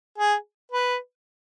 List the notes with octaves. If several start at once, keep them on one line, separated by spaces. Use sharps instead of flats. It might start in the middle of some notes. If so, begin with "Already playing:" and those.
G#4
B4